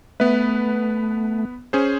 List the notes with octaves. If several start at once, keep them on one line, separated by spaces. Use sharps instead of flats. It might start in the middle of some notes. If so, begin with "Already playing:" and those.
A3 B3 B4
C#4 G#4 C5